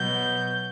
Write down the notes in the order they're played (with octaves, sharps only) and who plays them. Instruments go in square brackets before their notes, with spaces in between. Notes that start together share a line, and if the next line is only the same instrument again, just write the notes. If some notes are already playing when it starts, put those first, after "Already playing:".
Already playing: [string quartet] B2 F#3 G6